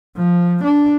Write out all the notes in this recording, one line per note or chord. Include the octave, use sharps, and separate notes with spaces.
F3
D4